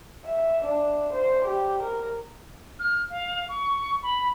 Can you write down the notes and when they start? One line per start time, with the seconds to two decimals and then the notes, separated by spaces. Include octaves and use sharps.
0.25 E5
0.65 D4
1.13 C5
1.45 G4
1.82 A#4
2.79 F6
3.10 F5
3.49 C#6
4.03 B5